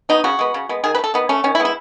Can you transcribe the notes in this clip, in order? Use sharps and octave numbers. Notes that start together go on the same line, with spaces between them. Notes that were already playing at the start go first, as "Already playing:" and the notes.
F#3 B3 D#4
C#3 F#4
G#3 B3
C#3
G#3 B3
D#3 G#4
B4
A3
A4
D#3 B3
A3 C#4
D#3 C#4
E4
G#3 B3
E4